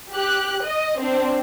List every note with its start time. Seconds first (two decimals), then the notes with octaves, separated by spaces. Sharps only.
0.12 G4 F#6
0.65 D#5
1.00 C4 D4